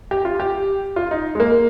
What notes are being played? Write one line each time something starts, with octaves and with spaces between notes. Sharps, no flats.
G4
F4
G4
F4
D#4
G#3
A#3